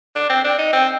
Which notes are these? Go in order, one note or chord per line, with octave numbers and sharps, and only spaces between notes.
D4
C4
D4
D#4
C4